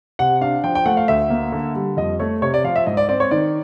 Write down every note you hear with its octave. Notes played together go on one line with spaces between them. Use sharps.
C3 F#5
D4 F5
F3 G5
G5
A3 F#5
F5
D2 E5
A#3
D3
G3
F2 D#5
A3 C#5
C3 C#5
D5
F3 F5
E5
G#2 D#5
D5
C4 D5
C#5
D#3 D5